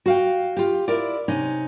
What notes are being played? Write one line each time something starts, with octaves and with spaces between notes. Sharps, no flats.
F#4 F5 G5
F4 G4
E4 F4 A#4 D5
C3 C#4 D#4